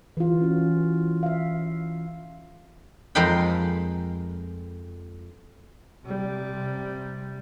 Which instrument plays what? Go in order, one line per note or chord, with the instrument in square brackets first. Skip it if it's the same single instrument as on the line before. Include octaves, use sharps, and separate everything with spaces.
[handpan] E3 F4
C#4 F#4
E5 F5
[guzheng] F2 G#3 A#4 F5 G5 B5
[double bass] C3 G3